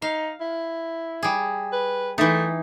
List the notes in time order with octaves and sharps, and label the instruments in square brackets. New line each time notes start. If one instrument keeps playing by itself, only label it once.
[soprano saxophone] D#4 [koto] F5
[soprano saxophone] E4
[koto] G3 G#4
[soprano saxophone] B4
[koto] E3 D#4 [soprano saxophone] A3